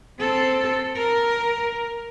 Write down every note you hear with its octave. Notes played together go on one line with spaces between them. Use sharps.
C4 A4
A#4